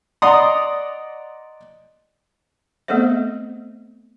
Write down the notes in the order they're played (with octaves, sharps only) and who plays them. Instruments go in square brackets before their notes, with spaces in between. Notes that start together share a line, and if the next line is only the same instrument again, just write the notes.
[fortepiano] D5 D#5 F#5 A#5 C6 D#6
[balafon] A3 B3 C4 A4 C5 E5